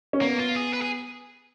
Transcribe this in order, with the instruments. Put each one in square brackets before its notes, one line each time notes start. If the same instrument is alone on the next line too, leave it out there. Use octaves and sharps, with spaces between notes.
[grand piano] C#4
[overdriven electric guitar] A#3 [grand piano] B3
[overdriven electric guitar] F4
G#4
B4
G#4